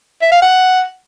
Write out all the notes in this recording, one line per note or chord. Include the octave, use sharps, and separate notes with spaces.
E5
F5
F#5